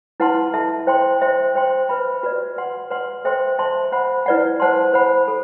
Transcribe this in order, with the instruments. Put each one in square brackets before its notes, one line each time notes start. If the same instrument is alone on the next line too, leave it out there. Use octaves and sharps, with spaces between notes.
[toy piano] E4 B4 F#5 A5 C6
A4 E5 A5
C5 G5 C6
C5 E5 G5 C6
C5 G5 C6
B4 E5 B5
F#4 B4 D5
B4 F#5 C6
B4 D5 F#5 C6
A4 C5 E5 G5 C6
C5 E5 A5 C6
C5 F#5 B5
E4 B4 D5 F#5
C5 F#5 A5 C6
C5 F#5 B5
A4